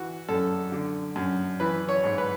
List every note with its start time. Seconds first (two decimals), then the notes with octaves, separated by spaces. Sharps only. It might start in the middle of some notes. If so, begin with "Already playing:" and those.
Already playing: E3 F#4
0.28 F#2 A4
0.72 D3
1.16 F#2
1.60 E3 B4
1.89 C#5
2.04 G#2
2.18 B4